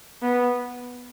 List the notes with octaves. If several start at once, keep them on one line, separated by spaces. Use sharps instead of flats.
B3